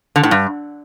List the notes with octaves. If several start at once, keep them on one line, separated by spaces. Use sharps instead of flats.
D3
A2
G2